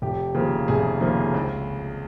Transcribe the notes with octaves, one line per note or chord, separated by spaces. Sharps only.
F1 G4
D#2 C#3 F3 A#3
F1 G#4
D#2 C#3 F3 A#3
C#2